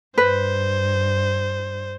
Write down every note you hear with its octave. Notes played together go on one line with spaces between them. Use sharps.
G2 B4 C5